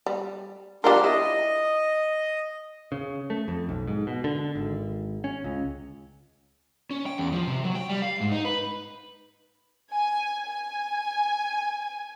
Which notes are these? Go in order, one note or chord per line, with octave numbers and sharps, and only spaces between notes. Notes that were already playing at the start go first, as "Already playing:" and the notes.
G3
G3 D4 F4 A#4 C6
E4 D#5
C#3
A3
F2
B1
G#2
B2
D3
G#1
C#4
C#2
C#4
G5
E2
F3
C3
F#3
G5
G3
F5
G#2
D#4
B4
G#5
G#5